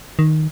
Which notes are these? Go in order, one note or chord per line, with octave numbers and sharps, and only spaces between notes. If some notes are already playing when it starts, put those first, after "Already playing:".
D#3